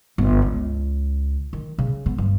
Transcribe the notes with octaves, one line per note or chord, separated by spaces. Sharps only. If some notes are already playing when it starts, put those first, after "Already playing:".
G1
C#2
D#3
C#3
B3
G2